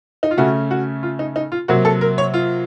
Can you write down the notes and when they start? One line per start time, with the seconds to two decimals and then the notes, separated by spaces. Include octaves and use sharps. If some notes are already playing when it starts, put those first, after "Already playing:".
0.23 D#4
0.31 F4
0.38 C#3 A3 C#4 F#4
0.71 F#4
1.03 F4
1.19 D#4
1.36 D#4
1.52 F4
1.68 C3 F#3 A#3 F#4
1.85 A4
2.01 A#4
2.18 C#5
2.34 F4